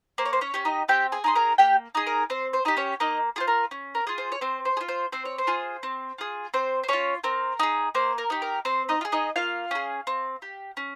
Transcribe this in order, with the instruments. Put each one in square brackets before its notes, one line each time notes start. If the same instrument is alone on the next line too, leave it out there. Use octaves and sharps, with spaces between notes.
[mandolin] A#3 C5
C#5
C5
C#4 C#5
C#4 G4
D#4 D#5
C4 G4 G5
G#4 G#5
D#4 G#4 C6
A#4 A#5
A#3 G4 G5
D#4 G#4
A#4
C4 C5
C5
D#4 G4 D#5
C#4 C#5
A#3 D#4 D#5
F4 G#4 C5
A#4
C#4
A#4
F4 G#4
C5
C#5
C4 C5
C5
G#4
F4
C5
C4 C5
C#5
C5
F4 G#4
C4
F4 G#4
C4 C5
C5
C#4 F4 G#4 C#5
C4 A#4
D#4 G#4
A#3 C5
A#4
D#4 G4
A#4
C4 C5
D#4 D#5
F4
G#4
D#4 D#5
A#3 F4 F5
C#4 G#4
C4
G4
C#4